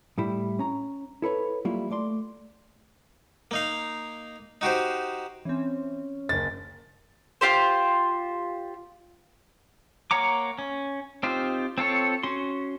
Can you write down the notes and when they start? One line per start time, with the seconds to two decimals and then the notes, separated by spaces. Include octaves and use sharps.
0.18 A2 G3 E4
0.59 C#4 A#5
1.22 E4 A4 B4 C#5
1.65 F#3 G3 A#3 E4 F4
1.91 A3 D5 C6
3.51 A#3 D#4 F5
4.61 D#4 F#4 G4 C5
5.45 E3 C4 C#4
6.29 F#1 D2 A6
7.41 F4 G4 C5
10.11 A#3 C#5 F#5 A#5 D6
10.58 C#4
11.23 C4 D#4 F4 G4 C5
11.78 C4 F4 A4 C#5
12.23 C#4 F#4 C6